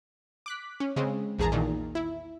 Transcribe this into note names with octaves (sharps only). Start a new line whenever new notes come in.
D6 F#6 B6
C#4
C#3 G#3 C4
A#1 E2 G#4 A5 A#5
E2 A#2 D#3
E4